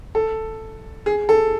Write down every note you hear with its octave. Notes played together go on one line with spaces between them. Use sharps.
A4
G#4
A4